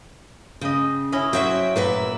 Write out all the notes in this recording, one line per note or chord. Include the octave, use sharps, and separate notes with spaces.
C#3 D#5 G5
C#4 E4 D#5
F#3 F#4 C5 E5 G5
A#2 A#3 B4 E5